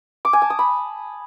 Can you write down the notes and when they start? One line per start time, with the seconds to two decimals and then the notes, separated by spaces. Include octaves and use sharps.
0.25 D6
0.33 G#5
0.42 A5
0.50 D#6
0.59 B5